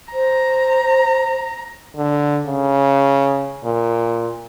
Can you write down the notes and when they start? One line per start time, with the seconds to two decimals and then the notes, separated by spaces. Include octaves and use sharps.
0.13 C5 A#5
1.96 D3
2.46 C#3
3.64 A#2